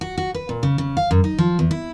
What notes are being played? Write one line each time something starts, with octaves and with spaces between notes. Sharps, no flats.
F#4
F#4
B4
A#2
C#3
C#3
F5
F#2
D#4
F3
E2
E4